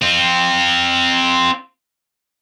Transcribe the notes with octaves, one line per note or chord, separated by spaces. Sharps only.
C4 F4